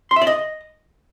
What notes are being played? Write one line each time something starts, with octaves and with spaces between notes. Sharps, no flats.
C6
E5
D5
D#5